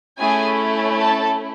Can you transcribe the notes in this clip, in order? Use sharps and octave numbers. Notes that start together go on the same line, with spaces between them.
A3 C#4 E4 G#4 G#5
A4 A5